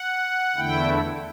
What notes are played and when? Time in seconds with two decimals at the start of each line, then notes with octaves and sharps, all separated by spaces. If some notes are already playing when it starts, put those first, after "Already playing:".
Already playing: F#5
0.56 E2 D3 A3 E4 G5